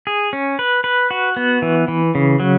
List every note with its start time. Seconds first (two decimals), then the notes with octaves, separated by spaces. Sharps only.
0.07 G#4
0.33 C#4
0.59 B4
0.84 B4
1.11 F#4
1.36 B3
1.62 E3
1.88 E3
2.15 C#3
2.40 F#3